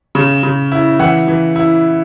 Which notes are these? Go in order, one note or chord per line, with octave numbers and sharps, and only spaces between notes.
C#3
C#3
E4
E3 F#5
E3
E4